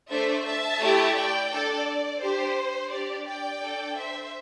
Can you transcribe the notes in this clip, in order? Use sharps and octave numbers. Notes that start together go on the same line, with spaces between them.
A3 D4 A4 C5 E5
E5 A5
A3 E4 G4
D5 G5
D4 A4 D5
D4 G4 C5
D4 G4 D5
D5 G5
D4 A4
C5 E5